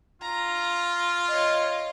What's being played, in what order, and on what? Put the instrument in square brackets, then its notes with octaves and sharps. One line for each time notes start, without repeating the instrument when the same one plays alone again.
[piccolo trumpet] F4 [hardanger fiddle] A#5
[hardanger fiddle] C#5 D#5